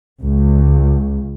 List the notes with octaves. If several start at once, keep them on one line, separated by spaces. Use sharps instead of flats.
C#2